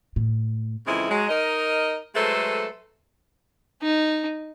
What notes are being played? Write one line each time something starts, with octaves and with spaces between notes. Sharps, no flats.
A2
F2 C#3 E3 G#3 C4 E4
F#3 G#3
D#4 A#4 D#5
F#3 G#3 A3 A4 B4 C5
D#4